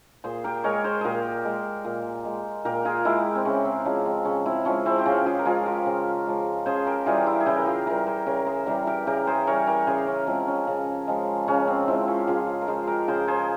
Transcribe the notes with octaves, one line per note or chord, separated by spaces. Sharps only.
A#2 G#4 C5
G4 A#4
G#3 A#4 C#5
G#4 C5
A#2 G4 G#4 A#4
G#3
A#2
G#3
A#2 G4 A#4
F4 G#4
G#3 E4 G4
C4
C#3 C#4
C4
F3 G#3 C#4
C4
C#3 C#4
C4 E4
F3 G#3 C#4
C4 E4
G4
C#3 C#4 F4
F4 G#4
A#4
F3 G#3 F4 G#4
G4 A#4
C#3
F3 G#3
C#3 G#4 C5
G4 A#4
E3 G3 F4 G#4
E4 G4
G#4
C#3 E4 G4
A#4
F4 G#4
E3 G3 G4 A#4
G#4 C5
C#3 A#4 C#5
G#4 C5
E3 G3 G4 A#4
G4 A#4
C#3 G4 A#4
G#4 C5
E3 G3 A#4 C#5
G4 A#4
C#3 G#4 C5
C#4
F3 G#3 C4
C#4
C#3
F3 G#3
C#3 C#4
C4
F3 G#3 C4 E4
C#4 F4
G4
C#3 F4 G#4
A#4
F3 G#3 G#4 C5
G4 A#4
C#3 G#4 C5
G#4 C5